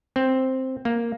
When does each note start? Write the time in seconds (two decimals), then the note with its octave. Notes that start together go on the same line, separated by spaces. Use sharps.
0.16 C4
0.85 A#3